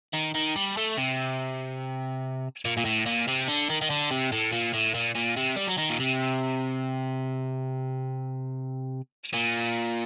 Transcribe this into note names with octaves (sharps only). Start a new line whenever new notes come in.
D#3
D#3
G3
A3
C3
A#2
A#2
A2
A#2
C3
D3
D#3
D#3
D3
C3
A2
A#2
A2
A#2
A#2
C3
G3
F#3
D#3
A#2
C3
A#2